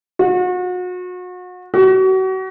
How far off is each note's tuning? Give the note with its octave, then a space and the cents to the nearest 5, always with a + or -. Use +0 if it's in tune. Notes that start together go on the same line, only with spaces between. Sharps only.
F#4 -35
F#4 +35